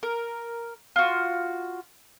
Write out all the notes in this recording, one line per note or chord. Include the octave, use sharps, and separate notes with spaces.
A#4
F4 F#4